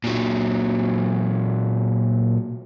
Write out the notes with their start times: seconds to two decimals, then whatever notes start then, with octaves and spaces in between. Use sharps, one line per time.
0.04 A#2 F#3